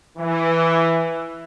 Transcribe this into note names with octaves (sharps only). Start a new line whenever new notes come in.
E3